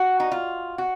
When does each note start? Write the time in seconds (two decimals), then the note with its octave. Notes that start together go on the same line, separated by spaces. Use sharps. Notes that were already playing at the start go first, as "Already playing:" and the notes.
Already playing: F#4
0.20 D#4
0.31 F4
0.78 F#4